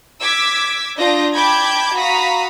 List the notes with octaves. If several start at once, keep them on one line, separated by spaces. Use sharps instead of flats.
D6 E6 G#6 B6
D4 F4 D#6 G6 A#6
G5 A5 B5 D6 G6 G#6
F#4 F5 A#5 B5 D#6 B6